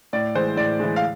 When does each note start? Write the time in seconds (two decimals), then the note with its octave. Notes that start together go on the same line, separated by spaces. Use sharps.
0.13 A2 D5
0.35 E3 G#3 C5
0.57 A2 D5
0.79 E3 G#3
0.96 F5